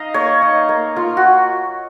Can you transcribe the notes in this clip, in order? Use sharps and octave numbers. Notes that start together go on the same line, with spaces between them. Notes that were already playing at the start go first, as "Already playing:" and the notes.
Already playing: D#4 D#5 F5
A#3 C#5
D#4
A#3
A#3 F4
F#4